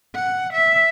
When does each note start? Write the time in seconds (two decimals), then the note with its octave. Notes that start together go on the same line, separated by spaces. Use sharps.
0.15 F#5
0.53 E5